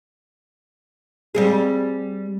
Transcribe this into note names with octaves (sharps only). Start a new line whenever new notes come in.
G3 C4 G#4